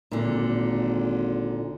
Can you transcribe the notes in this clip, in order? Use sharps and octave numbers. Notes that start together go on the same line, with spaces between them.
G#1 A#2 D3